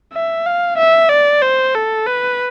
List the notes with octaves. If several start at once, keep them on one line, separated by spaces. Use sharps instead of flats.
E5
F5
E5
D5
C5
A4
B4